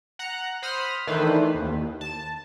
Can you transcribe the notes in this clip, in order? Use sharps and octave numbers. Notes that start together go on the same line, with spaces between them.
F#5 A#5 F#6
C5 B5 D#6 F6
D#3 E3 A3 D4 B4 C5
D#2
A5